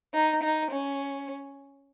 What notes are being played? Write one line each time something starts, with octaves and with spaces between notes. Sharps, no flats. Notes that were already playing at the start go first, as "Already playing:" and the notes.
D#4
D#4
C#4